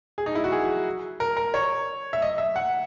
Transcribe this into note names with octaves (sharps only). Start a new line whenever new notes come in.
G#4
D#4
E4
F#4
G#4
A#4
A#4
C#5
E5
D#5
E5
F#5